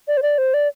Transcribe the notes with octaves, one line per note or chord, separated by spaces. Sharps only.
D5
C5
D5
C5
D5